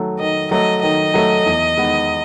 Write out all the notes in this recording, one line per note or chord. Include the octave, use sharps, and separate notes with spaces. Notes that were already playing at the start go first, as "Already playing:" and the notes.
Already playing: D#3 F#3 A3
D#3 D#5
F#3 A3 D#5
D#3 D#5
F#3 A3
E2
D#3 G#3 B3